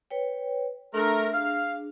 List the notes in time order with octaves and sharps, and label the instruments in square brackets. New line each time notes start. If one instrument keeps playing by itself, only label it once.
[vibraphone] B4 C#5 G5
[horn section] A3 A#4 [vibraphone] D4 C6
[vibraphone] D4 G#4 [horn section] F5